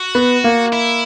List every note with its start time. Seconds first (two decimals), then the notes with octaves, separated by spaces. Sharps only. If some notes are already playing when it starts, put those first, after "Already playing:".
Already playing: F#4
0.15 B3
0.44 A#3
0.73 E4